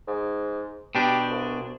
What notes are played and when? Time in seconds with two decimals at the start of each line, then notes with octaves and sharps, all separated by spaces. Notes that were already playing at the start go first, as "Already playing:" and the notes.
0.08 G#2
0.95 B2 D4 G4
1.29 C2